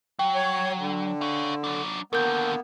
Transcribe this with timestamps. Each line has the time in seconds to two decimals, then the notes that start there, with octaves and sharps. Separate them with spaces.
0.19 F#3 G5
0.35 C#5
0.79 D3
1.21 C#5 F5
1.64 F#3 D4
2.13 D#2 D3 A#3 B3 A#4 G6